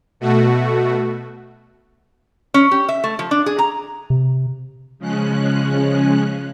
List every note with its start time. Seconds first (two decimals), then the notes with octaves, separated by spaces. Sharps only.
0.20 B2 A3 F#4
2.54 C#4
2.72 G4
2.89 E5
3.04 A3
3.19 F3
3.31 D4
3.46 G#4
3.59 A#5
4.10 C3
4.99 C#3 F3 G#3 C#4 F#6